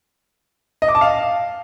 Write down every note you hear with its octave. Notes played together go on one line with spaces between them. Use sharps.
D#5
D6
A5
F5